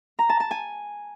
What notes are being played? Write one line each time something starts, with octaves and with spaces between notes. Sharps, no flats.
A#5
A5
A5
G#5